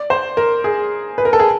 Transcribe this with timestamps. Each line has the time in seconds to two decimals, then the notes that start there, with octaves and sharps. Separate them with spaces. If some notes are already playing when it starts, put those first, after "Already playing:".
Already playing: D5
0.10 C5
0.37 A#4
0.64 G#4
1.18 B4
1.25 A#4
1.33 A4
1.40 G#4